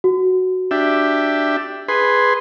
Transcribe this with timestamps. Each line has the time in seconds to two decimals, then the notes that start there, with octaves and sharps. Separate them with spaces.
0.04 F#4
0.71 D4 G4 E5
1.88 G#4 B4 C6